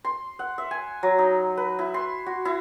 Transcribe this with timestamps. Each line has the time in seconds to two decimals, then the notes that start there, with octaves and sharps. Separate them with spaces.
0.05 C6
0.39 F#5
0.58 E5
0.71 G#5
1.03 F#3
1.18 D#4
1.57 B4
1.79 E4
1.94 C6
2.26 F#4
2.45 E4